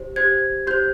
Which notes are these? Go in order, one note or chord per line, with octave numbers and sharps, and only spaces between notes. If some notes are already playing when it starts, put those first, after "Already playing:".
Already playing: G4 C5
G4 C5 G#6
G4 C5 G6